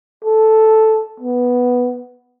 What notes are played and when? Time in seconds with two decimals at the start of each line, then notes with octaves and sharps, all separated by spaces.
0.24 A4
1.20 B3